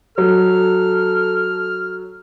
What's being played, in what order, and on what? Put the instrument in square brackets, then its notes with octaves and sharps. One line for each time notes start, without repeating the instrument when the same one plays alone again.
[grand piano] F#3 [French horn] A4 [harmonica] F6